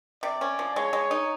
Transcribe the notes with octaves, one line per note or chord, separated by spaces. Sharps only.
C3 D5
C#4
F3
G#3 C#5
G#3
D#4